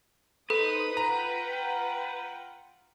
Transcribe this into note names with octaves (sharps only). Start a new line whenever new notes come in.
D#4 A4 B4 C5 D#6
F4 F#5 G5 A#5